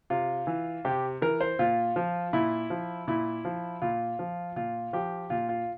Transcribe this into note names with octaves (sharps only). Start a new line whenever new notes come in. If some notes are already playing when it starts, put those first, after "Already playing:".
C3 F4
E3
C3 G4
E3 A#4
C5
A#2 F4
F3
A#2 E4
F3
A#2 E4
F3
A#2 F4
F3
A#2 F4
F3 G4
A#2 F4
F4